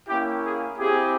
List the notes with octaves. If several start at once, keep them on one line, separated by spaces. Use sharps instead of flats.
A#3 C#4 E4 G4
G#4
C4 E4 G4 G#4